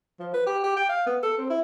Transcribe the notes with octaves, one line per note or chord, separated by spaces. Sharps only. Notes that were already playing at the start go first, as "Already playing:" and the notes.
F3
B4
G4
G4
G5
F5
B3
A4
C4
E4